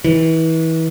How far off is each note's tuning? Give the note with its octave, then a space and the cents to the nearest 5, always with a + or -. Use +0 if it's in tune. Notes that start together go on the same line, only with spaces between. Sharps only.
E3 -30